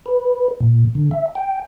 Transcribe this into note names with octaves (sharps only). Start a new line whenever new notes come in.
B4
A#2
D3
E5
G5